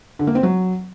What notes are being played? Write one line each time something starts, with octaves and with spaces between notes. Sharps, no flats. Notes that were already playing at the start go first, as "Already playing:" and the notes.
D3
A#3
C4
F#3